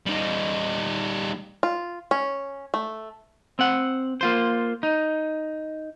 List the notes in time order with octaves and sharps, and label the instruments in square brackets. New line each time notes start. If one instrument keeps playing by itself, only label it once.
[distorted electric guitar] G3 D#4
[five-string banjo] F4
C#4
A3
[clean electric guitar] C4 F#5
A#3 F4 C5
D#4